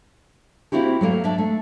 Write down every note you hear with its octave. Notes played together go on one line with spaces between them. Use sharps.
A#3 C4 E4 F#4 G4
F#3 A3 A#3
D4 E5
A3